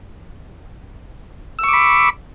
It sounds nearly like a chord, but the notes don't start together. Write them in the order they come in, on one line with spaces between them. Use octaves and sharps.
E6 C#6 D6 B5